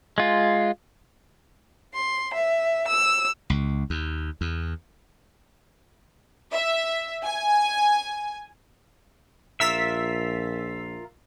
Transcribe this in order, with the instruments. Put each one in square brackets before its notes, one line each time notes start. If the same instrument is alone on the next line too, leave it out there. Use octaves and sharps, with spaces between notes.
[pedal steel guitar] G#3 F4
[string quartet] C6
E5
E6
[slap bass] C#2
D#2
E2
[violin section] E5
G#5
[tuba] A#1 [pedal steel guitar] F4 A#4 E5 [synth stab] E6 B6